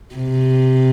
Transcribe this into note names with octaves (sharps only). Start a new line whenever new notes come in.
C3